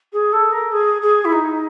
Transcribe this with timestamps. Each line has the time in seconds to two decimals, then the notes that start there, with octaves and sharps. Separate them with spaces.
0.12 G#4
0.32 A4
0.52 A#4
0.71 G#4
1.01 G#4
1.24 E4
1.32 D#4